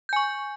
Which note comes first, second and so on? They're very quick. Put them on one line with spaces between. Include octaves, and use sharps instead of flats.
G6 G#5 C#6